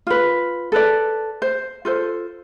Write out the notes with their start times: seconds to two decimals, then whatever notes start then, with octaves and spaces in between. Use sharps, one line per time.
0.07 F4 B4
0.72 A4 B4 D5
1.42 C5
1.85 F4 A4 C5